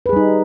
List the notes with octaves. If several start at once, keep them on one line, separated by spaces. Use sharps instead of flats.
G3 D#4 G#4 B4